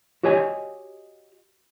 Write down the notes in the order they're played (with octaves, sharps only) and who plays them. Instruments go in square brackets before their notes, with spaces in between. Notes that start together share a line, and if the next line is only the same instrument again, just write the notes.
[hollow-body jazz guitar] F#4 G4 C#5 D#5 G#5